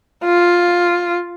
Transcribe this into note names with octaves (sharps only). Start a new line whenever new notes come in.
F4